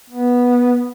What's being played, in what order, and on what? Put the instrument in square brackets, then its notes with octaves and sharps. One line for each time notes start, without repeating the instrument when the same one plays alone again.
[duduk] B3